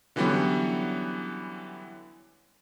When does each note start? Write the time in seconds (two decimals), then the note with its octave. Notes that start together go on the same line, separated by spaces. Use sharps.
0.16 D3 E3 F#3 G3 B3 C#4